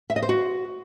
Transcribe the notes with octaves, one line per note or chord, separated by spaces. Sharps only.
E5
D#5
C5
F#4